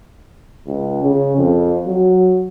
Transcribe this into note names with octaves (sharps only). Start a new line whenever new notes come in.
C#2
C#3
F2
F#3